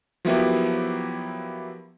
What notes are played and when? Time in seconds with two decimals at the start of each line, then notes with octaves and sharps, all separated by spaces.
0.25 F3 F#3 A#3 B3 E4 G4